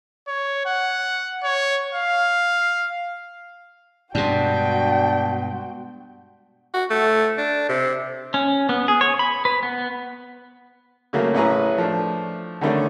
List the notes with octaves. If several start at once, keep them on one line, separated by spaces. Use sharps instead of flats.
C#5
F#5
C#5
F5
G2 B2 G#3 B3 D4 F#4 G5 C6
F#4
A3
D4
C3
C#4
B3
G#4
C#5
B5
B4
B3
C#3 F#3 A3 A#3
A1 C#4 E4 G#4 B4 A#5
F3 A3 D4
D3 D#3 G3 A3 C#4 D4